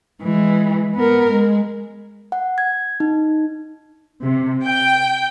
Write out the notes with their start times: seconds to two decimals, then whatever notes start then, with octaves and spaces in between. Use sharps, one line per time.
0.22 E3 G#3
0.95 B3 A#4
1.31 G#3
2.32 F#5
2.58 G#6
3.00 D#4
4.23 C3
4.65 G5